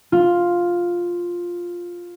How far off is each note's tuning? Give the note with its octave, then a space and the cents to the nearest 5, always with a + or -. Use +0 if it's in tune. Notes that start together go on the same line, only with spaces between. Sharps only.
F4 +5